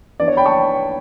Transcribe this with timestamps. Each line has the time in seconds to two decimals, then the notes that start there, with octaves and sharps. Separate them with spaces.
0.20 E3 B3 D4 D5
0.28 C#5
0.37 G5 B5
0.46 A5 C#6